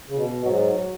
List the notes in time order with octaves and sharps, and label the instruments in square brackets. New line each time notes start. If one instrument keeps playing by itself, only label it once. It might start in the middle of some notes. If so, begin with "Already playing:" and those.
[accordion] C#3
B2
[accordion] G#2 [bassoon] F#3